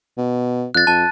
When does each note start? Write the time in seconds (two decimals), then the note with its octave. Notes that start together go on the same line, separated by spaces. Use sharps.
0.17 B2
0.75 F2 F#6 A6
0.87 F2 A5